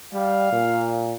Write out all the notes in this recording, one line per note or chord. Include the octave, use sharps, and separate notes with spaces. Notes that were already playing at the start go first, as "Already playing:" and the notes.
G3 F5
A#2